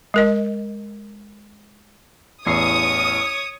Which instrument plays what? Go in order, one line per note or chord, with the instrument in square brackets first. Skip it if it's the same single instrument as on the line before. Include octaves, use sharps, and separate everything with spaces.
[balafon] G#3 A#4 D#5
[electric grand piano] A1 E2 C7 [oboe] C#5 [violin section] D#6